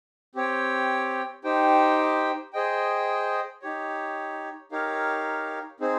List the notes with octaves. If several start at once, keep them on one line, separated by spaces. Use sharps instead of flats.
C4 G4 C#5 G5
D#4 G4 C5 G5
G#4 C5 D#5 G5
D#4 G4 C#5
D#4 G4 A#4 C#5 F5
C4 D#4 G#4 C5